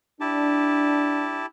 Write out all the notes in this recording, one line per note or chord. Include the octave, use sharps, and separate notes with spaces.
D4 E4 G4 A5